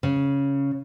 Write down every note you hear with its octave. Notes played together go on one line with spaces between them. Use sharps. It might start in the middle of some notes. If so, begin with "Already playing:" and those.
C#3